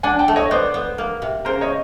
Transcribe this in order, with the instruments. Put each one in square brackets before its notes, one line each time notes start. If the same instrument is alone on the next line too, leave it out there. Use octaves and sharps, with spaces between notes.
[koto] D4 [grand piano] F#5 G#5
[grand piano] G5 A5
[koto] A3
[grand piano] C#5 D#5
[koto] B3 [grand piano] C5 D5
[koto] B3
A#3
C3
[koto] C#3 [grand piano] A#4 C5
[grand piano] C#5 D#5